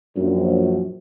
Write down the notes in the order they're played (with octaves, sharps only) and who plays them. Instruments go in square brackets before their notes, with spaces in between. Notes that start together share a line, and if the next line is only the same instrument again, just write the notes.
[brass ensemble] A#1 F#2